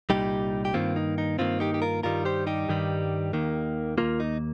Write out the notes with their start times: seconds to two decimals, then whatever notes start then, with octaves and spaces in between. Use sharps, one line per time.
0.10 C2 A#2 G3 D#4 G4
0.65 G4
0.74 G2 D#3 A#3 C4 F4
0.96 D#4
1.18 D#4
1.39 G2 D#3 A#3 C4 F4
1.60 D#4 G4
1.74 G4
1.82 F4 A#4
2.03 G2 D#3 G3 F4 A#4
2.25 G4 C5
2.47 D#4 G4
2.69 G2 D#3 G3
3.33 D#2 D#3 A#3
3.98 D#2 D#3 A#3 F4 A#4
4.20 D#4